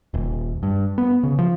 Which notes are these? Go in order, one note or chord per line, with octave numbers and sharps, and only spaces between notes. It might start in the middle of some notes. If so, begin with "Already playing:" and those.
D#1
G2
B3
C#3
F3